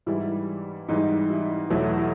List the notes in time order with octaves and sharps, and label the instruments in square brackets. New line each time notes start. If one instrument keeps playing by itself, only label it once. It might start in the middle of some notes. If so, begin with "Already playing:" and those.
[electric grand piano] G#2 E3 G3 [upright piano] E4
[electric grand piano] G#2 E3 G3 [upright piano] D#4
[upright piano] E4
[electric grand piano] E2 B2 F#3 A3 [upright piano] E4
[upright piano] E4